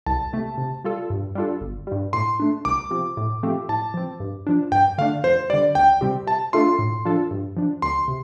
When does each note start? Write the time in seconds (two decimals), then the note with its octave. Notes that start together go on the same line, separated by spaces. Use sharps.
0.06 C2 A5
0.33 C3 A3
0.58 C3
0.84 G3 F4 A4
1.10 G2
1.35 G3 D4 F4 A4
1.61 G1
1.87 G2 G3
2.13 A2 C6
2.40 A3 D4
2.65 C2 D6
2.90 C3 F3 C4
3.17 A2
3.43 F3 A3 C4 G4
3.69 A2 A5
3.94 F3 C4
4.20 G2
4.47 F3 D4
4.72 G2 G5
4.98 D3 A3 D4 F5
5.23 F2 C5
5.50 G3 D5
5.53 D3
5.75 D2 G5
6.01 C3 G3 C4 G4
6.27 C3 A5
6.53 A3 D4 F4 A4 C6
6.79 A2
7.05 F3 D4 F4 A4
7.31 G2
7.57 F3 D4
7.82 D2 C6
8.08 C3